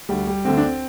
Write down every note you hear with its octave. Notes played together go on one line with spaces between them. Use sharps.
D2 D3 G3
G3
D2 D3 C4
D4
C4